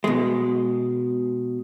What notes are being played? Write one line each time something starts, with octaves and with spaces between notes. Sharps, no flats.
B2 G#3